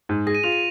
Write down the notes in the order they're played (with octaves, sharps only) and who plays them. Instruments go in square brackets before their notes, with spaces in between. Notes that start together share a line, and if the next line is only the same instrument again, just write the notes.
[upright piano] G#2
[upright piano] G#4 [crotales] A#6
[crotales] D#7
[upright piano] F4 [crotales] F7
[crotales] D#7